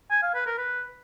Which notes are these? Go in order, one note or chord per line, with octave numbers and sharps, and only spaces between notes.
G#5
F5
B4
A#4
B4